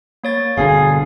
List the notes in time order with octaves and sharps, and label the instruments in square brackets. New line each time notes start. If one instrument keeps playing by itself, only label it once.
[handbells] A#3 C#5 A6
[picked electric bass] G1 B2 D3 [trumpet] G#4 [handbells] F5